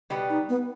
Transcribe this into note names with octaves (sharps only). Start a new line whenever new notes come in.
B2 G3 B3
D#4
B3